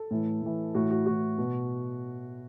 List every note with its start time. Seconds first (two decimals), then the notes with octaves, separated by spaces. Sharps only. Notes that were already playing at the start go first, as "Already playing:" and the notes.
Already playing: A4
0.11 A2 E3
0.42 A2 E3
0.75 A2 E3 F#4
0.91 F#4
1.06 A2 E3 F#4
1.38 B2